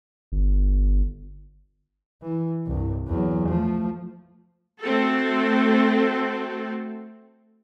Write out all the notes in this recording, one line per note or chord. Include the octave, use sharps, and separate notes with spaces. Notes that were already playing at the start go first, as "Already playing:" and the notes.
G1
E3
C2 G2
E2 F#3
F3 A3
A3 C4 F#4 A4